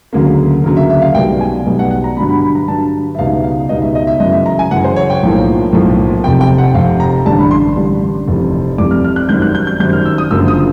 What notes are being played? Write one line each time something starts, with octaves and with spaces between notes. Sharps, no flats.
D2 C#3 F#3 A#3
D2 C#3 F#3 A#3 A#4
E5
E5
F5
B1 B2 G3 G5
G#5
B1 B2 G3
F#5
F#5
A#5
G2 D3 F#3 B5
B5
B5
A#5
G2 D3 F#3 A5
E5
C#2 B2 G3 B3 D#4 F5
F5
C#2 B2 G3 B3 D#4 D#5
E5
D#5
E5
F#2 C#3 E3 D#5
E5
A#5
G#5
F#2 C#3 E3 F#5
C5
C#5
G5
B1 A2 F3 A#3
B1 A2 F3 A#3
F1 F2 C3 G5
G5
F#5
F1 F2 C3 F5
A#5
A1 G2 D3 G3 A5
B5
C6
A1 G2 D3 G3
F1 F2 C3 E3 G3
F1 F2 C3 E3 G3 D6
F6
F6
F#6
G#1 F#2 D#3 G3 G6
F#6
G6
G6
G#1 F#2 D#3 G3 G6
F6
E6
D#6
F#1 F#2 D3 F3 A#3 E6
D#6